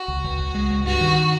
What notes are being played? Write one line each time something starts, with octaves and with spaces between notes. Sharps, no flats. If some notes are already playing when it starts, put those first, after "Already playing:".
Already playing: F#4
C#2
C#2
C#2
G#3
C#2
G2 F#4
D#3